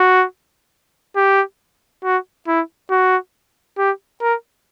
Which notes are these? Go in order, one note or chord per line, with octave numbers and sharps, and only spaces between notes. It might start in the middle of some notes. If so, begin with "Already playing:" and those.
Already playing: F#4
G4
F#4
E4
F#4
G4
A#4